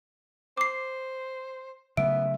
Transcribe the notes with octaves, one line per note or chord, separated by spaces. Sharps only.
C5 D6 C7
C#3 F#3 A3 B3 E5 D7